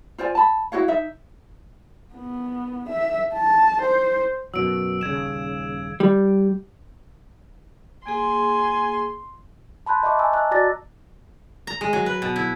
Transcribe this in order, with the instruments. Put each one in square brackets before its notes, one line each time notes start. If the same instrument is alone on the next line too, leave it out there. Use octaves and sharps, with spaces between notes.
[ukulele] F4 C5 D5 G#5
A5 B5
E4 F#4 C#5 F5
D#4 E5
[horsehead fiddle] B3
E5
A5
C5
[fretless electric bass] F#2 B2 F#3 [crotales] E6 D7
[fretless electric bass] D#1 C#3 [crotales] G#6 E7
[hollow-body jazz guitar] G3
[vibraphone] A#3 G#4 [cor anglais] G#5 [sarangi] C6
[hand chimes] A5 B5 C6 F#6 G6
D#5 E5 A5 C#6 D6
G#5 A#5 E6
D#5 A5 A#5 E6 F#6
F#4 D5 A#5 D6 A6 A#6
[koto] A#5
G#3
F#3
B4
B2
E4